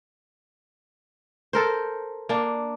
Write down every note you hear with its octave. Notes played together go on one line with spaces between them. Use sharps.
A4 A#4 C5
A#3 D4